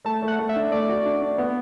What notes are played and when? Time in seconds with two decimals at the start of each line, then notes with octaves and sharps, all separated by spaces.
0.05 A3 A5
0.22 A3
0.28 F#5
0.39 A3
0.49 E5
0.56 D4
0.72 A3 D5
0.89 F#4
1.06 D4
1.22 D4
1.38 B3